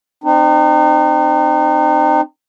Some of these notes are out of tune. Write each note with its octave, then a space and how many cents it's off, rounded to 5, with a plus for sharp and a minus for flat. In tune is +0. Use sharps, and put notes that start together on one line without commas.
C4 +0 D#4 -35